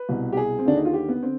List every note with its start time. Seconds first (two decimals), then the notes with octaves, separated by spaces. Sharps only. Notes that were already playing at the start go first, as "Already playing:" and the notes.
Already playing: B4
0.09 C2 B2
0.33 G4
0.37 G#4
0.59 C4
0.65 D#2 D3 D4
0.77 D#4
0.85 F4
0.93 G4
1.09 B3
1.22 D3 C4